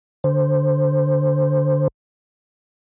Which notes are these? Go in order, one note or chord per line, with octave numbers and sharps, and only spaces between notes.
D3 C5